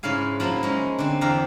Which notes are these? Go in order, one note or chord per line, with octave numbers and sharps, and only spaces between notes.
G#2 C#3 E4 F5 G#5
F3 F#3 A#3 E4
G#3 C#4 D#4
D3 C4
E2 D3 G4 E5 F5 A#5